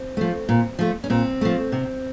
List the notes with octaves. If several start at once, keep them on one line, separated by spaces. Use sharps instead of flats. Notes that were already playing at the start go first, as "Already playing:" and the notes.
Already playing: C4
F3 A3
A#2
F3 A3
C#4
A#2 C4
F3 A3
C3